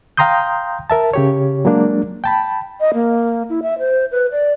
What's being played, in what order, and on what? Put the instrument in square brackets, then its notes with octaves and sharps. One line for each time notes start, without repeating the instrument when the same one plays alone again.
[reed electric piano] F5 G5 A#5 C6 D#6 G6
A#4 E5 A5
C#3 G4 C#5
F#3 G#3 A#3 D4
G5 A5 B5
[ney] D#5
A#3
E4
E5
C5
B4
D5